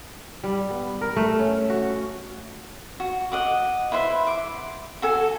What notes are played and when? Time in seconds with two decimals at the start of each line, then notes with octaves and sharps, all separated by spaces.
0.44 G3
0.71 B3
1.01 A#4
1.16 A3
1.39 C#4
1.70 F#4
3.00 F#4
3.32 D#5 F#5 D6
3.92 E4 B4 C5 E5
4.27 D6
5.02 F#4 A4 G#5